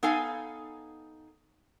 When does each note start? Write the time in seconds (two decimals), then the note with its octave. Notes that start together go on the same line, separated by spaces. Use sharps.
0.03 B3 D#4 A4 F5 G#5